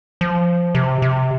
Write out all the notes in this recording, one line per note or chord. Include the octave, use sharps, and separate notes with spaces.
F3
C3
C3